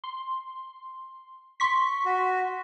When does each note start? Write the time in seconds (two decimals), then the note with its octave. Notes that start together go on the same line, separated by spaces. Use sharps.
0.04 C6
1.60 C6 C#6 B6
2.06 F#4